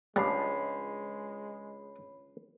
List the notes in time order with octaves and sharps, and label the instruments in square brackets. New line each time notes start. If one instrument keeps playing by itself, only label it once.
[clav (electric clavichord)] C#2 F3 D4 [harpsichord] G3 [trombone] G#3 [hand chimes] C#5 B5 C7